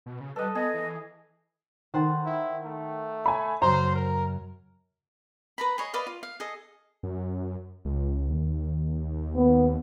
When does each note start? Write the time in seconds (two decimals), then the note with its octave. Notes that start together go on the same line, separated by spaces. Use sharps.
0.06 B2
0.20 C#3
0.36 G3 A4 B4 D#5
0.55 B3 G#4 D#5
0.74 E3
1.94 D#3 C5 F#5 A5
2.26 E4
2.65 A3
3.26 G#5 B5
3.62 F#2 C#3 F#3 C5 A#5
3.96 A#4
5.58 B4 A#5 B5
5.78 G#4 C#5 D#5
5.94 B4 D5 D#5 F5
6.07 F4
6.23 F5
6.40 G#4 A4 D#5
7.03 F#2
7.85 C#2
8.30 D#2
9.36 B3